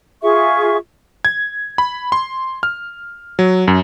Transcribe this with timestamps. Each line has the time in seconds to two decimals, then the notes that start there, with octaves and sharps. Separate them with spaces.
0.23 F4 G#4 E5 C#6
1.25 G#6
1.78 B5
2.12 C6
2.63 F6
3.39 F#3
3.68 F#2